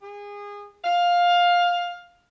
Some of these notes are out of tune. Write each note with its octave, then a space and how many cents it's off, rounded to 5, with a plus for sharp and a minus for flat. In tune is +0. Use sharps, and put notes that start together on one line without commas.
G#4 -25
F5 +10